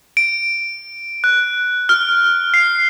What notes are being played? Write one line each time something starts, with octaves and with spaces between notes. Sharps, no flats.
D7
F#6
F6
C7